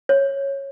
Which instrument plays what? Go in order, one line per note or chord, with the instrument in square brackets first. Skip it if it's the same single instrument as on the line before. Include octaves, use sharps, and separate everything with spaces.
[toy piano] C#5